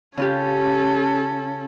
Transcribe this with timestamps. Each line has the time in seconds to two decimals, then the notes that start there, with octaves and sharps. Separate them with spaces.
0.17 C#3 C#4 F4 G4 A4